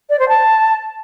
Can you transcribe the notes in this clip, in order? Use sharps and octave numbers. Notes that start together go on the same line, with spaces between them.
D5
C5
A5